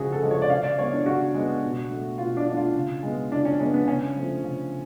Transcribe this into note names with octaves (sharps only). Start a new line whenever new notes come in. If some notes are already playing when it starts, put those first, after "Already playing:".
Already playing: C#3 F3 G#3 F#4 G#4
A4
F3 G#3
C#5
D5
C#3 F5
D5
G#3 B3 C#5
D4
C#3 F#4
G#3 B3
B2
A3
B2 F4
D4
A3 D4
F4
C#3
G#3 B3
C#3 D4
C#4
G#3 B3 C#4
B3
C#3 C#4
F3 A3
C#3